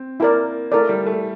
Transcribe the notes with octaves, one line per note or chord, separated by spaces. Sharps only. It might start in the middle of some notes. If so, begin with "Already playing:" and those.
Already playing: C4
A#3 E4 A#4 D5
A3 E4 A#4 D5
G3
A3